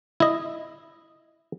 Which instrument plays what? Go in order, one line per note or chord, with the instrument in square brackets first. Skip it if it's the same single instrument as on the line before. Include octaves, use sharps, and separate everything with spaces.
[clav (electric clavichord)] E4 D#5